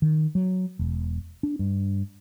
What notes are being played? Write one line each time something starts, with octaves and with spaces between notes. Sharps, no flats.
D#3
F#3
E1
D4
G2